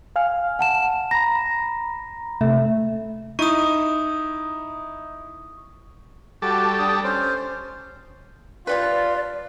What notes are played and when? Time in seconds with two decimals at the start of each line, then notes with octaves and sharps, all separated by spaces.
0.16 F5 G#5 F6
0.59 F#5 A5 E7
1.11 A#5 B5 A#6
2.41 C3 A3 E5
3.39 D#4 E4 C#6 D#6 D#7
6.42 G3 F#4 A4 D6
6.79 D4 D#6
7.04 C#4 C5
8.67 F3 G3 F4 B4 D5